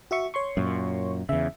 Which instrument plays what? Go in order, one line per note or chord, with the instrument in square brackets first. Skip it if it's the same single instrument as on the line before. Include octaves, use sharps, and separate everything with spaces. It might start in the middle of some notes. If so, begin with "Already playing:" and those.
[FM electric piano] F#4 E5 C#6
C#5 C6 C#6
[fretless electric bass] F#2 A#2
[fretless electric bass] E2 C#3 [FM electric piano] E5